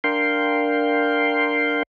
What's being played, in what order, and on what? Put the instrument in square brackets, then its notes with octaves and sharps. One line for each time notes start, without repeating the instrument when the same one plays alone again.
[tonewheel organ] D4 A#4 F5 G5 C6